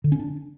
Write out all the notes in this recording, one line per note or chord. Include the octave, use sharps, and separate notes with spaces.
D3
C#4
D4